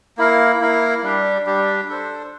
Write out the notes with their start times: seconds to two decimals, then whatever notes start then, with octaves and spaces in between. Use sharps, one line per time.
0.18 A#3 E4 A#4 F5
0.60 A#3 E4 A#4 F5
1.03 G3 D4 G4
1.46 G3 D4 G4
1.88 D4 A4 C5